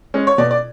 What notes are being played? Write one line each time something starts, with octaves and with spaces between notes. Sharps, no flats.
G#3 C#4
C#5
B2 D5
D5